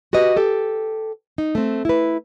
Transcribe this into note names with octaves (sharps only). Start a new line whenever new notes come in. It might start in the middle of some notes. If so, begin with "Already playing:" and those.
F#4 G4 B4 D#5
G4 A4
D#4
A3 C4
E4 B4